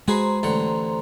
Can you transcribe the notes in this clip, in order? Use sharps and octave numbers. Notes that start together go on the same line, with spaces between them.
G#3 F#4 G#4 B4 C5 A#5 C6
A1 D3 F#5